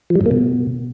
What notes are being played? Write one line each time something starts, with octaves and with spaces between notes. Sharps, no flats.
F3
G3
G2
A#3
B2